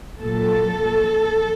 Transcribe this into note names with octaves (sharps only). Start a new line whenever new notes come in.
A#2 F#3 A#3 A4